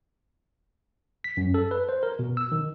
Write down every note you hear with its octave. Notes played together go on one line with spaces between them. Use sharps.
B6
F#2
A4
B4
C5
A#4
B2
E6
D#3